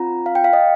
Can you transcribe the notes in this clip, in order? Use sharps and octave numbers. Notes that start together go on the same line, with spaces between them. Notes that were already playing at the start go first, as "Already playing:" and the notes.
Already playing: C4 F4 A#5
F5
G5
F5
D#5